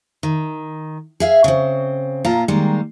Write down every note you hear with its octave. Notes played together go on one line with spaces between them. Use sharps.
D#3
G#4 E5 F5
C#3 C4
A#2 F4 F5 A5 A#5
D#3 G3 G#3 A#3